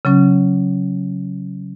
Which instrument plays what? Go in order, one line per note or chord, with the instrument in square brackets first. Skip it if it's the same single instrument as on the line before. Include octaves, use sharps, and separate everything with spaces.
[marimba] C#3 F#3 C#4